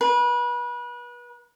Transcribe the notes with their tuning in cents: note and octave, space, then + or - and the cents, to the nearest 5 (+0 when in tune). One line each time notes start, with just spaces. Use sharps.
B4 -30